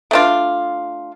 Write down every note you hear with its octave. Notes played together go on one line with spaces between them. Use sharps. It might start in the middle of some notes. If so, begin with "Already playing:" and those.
A3 D4 F4